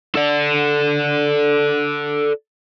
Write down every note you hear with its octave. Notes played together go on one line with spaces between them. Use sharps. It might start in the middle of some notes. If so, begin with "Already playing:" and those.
A4 D5